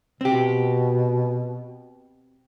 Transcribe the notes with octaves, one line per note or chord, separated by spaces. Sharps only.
B2 C4 G4